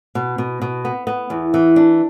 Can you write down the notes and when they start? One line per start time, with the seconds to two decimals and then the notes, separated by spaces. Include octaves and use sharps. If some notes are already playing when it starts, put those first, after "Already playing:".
0.15 B2
0.38 B2
0.62 B2
0.85 B3
1.07 B3
1.30 E2
1.54 E3
1.76 D4